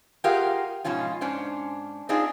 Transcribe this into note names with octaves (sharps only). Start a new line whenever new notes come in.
F4 G4 G#4 A#4 F5 F#5
G#2 B2 F3 C#4 F4
G#2 C#4 D4 C5
C4 D4 D#4 F4 G#4